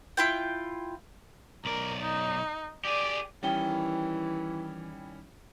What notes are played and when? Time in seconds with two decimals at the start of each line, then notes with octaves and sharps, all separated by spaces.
0.17 E4 F4 G5
1.65 B1 A#4 D5
2.01 D#4
2.85 G4 G#4 D5
3.43 D#3 E3 G3 C#4 E4 G5